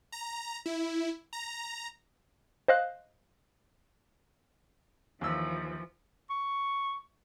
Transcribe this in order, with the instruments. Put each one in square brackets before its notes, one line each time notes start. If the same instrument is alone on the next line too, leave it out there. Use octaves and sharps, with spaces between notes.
[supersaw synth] A#5
E4
A#5
[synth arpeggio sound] C5 D#5 F5 F#6
[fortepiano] D#2 E6 [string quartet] E3 F3
[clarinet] C#6